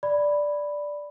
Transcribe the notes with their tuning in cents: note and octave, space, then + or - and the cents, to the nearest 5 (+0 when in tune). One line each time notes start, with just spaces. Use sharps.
D5 +0 B5 +0